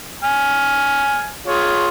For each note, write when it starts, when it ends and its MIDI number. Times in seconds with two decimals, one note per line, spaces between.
0.24 1.29 80
0.24 1.29 89
1.47 1.89 65
1.47 1.89 68
1.47 1.89 73